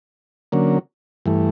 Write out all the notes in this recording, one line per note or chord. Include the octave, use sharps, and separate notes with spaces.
D3 F#3 A#3 C#4
G2 E3 A3